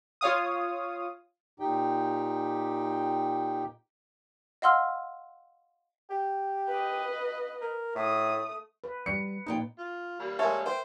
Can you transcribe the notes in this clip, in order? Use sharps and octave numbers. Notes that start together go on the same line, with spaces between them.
F4 C#5 F5 D#6
A#2 D#4 G4 G5
D#5 F5 F#5 C6 E6 F6
G4
B4 D#5
A#4
A2 A3 D#6
B4
G3 C#7
F2 A#2 D#4 G5
F4
G3 A#3 B5
G#3 A4 A#4 C#5 E5
B4 C5 G5